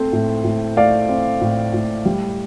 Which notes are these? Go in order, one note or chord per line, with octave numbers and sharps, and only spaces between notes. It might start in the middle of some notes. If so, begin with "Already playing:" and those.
Already playing: A3 C4 A4 C5
A2
A2
A3 D5 F5
C4
A2
A2
G3